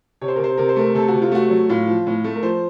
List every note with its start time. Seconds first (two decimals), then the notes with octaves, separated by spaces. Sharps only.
0.21 C3 C#5
0.28 C5
0.36 A#4
0.39 C3 C5
0.58 C3 A#4
0.69 C5
0.76 A3 A#4
0.95 C3 A4
1.08 F#4
1.13 C3
1.22 F4
1.31 A3 F#4
1.50 F#3
1.69 A2 F4
1.87 F3
2.07 A2
2.24 A3
2.36 A#4
2.43 F3 C5